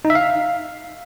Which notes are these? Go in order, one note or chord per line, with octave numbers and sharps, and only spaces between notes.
D#4
E5
F5